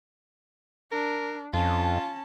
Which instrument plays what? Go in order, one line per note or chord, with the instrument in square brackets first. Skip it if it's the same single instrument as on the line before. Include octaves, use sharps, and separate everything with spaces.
[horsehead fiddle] D4 [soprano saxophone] A#4
[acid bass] F2 [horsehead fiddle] C#4 A5 [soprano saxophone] F4